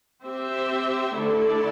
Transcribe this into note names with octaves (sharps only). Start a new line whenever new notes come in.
C4 G4 C5 E5
D3 A3 E4 A4 D5